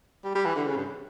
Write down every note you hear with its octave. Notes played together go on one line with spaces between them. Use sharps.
G3
G3
E3
D3
C#3
G2